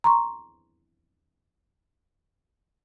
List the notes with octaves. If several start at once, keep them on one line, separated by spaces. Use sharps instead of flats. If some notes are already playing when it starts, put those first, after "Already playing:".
A#5 C6 C#6